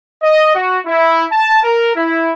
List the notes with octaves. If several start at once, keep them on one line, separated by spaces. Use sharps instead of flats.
D#5
F#4
E4
A5
A#4
E4